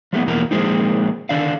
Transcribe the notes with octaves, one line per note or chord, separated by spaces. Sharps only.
F3 G3 A3 B3
E2 B2 F3 A#3 A#5
A#2 D#3 F3 G#3 C4 D#4
D3 D#3 D4 F5